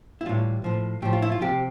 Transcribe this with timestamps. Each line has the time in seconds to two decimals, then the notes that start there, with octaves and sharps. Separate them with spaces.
0.21 E4
0.26 A2 E3 G3 F4
0.64 A2 F3
1.02 A2 F3 G4
1.13 F4
1.22 E4
1.32 F4
1.41 C3 F3 G4